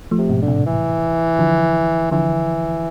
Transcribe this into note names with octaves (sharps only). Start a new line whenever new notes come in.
F3 A3
C3
G#2 B2
D3
A2 C3
E3
D3 F3
D3 E3 F3